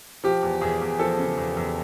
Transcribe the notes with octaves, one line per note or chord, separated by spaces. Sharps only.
F3 G4
E2
E2 G#4
E2
F3 A4
C#3
E2
E2